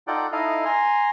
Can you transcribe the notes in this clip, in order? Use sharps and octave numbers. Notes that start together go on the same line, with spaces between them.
D#4 F4 A4 D5 F#5 G5
D#4 E4 A4 D#5 F5
G#5 A#5 C6